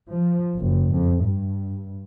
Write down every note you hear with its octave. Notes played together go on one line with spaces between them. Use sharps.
F3
F#1
F2
G2